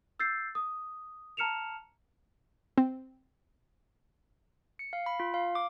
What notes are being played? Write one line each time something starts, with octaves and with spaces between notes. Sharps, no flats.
E6 G6 A6 C7
D#6
A5 A#5 F6 C#7 E7 F7
C4
C#7
F5
B5
F4
F5
D6